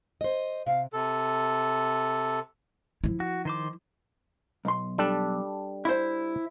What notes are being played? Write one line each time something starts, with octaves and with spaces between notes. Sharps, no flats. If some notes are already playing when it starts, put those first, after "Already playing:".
C5 D#5
C3 F5
C3 A4
F3 E4
F#4
D#3 C5 D6
B1 C6
G3 D4 A4
E4 C5